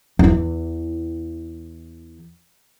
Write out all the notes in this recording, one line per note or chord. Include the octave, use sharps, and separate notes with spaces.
E2 E3